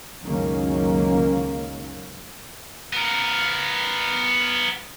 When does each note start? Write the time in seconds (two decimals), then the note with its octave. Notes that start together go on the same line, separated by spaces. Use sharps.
0.24 C#2 F#2 D#3 F#3 A#3 C#4
2.93 B3 A#4